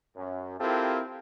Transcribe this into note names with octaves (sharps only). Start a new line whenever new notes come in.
F#2
C4 E4 F4 G4 A4 A#4